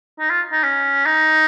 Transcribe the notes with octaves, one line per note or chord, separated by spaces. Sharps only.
D#4
F4
D#4
C#4
D#4